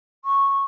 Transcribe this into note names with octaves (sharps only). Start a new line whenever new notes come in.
C#6